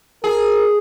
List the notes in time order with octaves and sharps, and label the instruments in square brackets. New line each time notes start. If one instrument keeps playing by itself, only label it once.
[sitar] G#4 [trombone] A#4